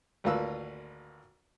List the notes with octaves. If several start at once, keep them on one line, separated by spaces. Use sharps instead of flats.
G#1 D2 A#3 F4 B4 E6